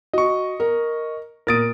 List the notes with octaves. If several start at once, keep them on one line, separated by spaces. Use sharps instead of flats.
F#4 D#5 C#6
A#4
A#2 A#4 D#6 A6 D7